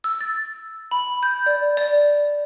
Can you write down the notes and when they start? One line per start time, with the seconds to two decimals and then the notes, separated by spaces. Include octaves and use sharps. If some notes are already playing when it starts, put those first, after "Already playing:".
0.04 E6
0.21 A6
0.91 B5
1.23 G6
1.46 D5
1.77 D5